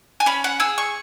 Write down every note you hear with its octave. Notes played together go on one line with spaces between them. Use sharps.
G#5
C#4 B5
F#5
G#4 E6
C#6